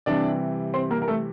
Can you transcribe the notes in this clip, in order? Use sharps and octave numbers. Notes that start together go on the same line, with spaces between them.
C3 E3 G3 D4 D5
C4 C5
A#3 A#4
A#4
A3 A4